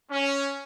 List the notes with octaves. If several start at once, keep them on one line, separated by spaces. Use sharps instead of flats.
C#4